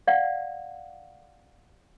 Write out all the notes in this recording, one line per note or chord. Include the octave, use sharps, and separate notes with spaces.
D5 F5 F#5